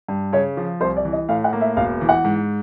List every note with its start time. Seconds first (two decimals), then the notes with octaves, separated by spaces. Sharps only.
0.08 G2
0.33 C#3 C#5
0.57 F3
0.80 C2 C5
0.97 D5
1.05 E3
1.13 D#5
1.29 A2 F5
1.44 F#5
1.53 A#3
1.61 E5
1.77 E1 F5
2.01 E3
2.09 F#5
2.25 G#2